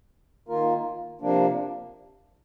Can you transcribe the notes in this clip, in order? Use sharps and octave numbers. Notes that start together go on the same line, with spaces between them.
D#3 A#3 F4 A#4
C3 F3 A#3 D4